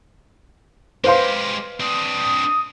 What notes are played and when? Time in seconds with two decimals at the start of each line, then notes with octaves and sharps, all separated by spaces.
1.04 G#3 G4 B4 C5 F5 C6
1.80 C4 D4 D#6